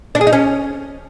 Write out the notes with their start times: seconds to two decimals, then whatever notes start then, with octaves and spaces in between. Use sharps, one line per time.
0.15 D4
0.21 G#4
0.27 D#4
0.33 C#4